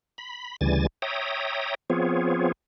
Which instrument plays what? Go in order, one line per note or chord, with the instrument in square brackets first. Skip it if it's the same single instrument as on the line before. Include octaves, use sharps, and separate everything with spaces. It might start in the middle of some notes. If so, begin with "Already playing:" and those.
[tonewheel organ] B5
D2 C#3 E3 G3 G#5 A6
C#5 E5 G5 A#5 D#6
F3 B3 C4 F4 G#4 C#5